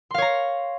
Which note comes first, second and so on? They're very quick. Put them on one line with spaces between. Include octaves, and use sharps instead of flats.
C6 F5 C#5 A#5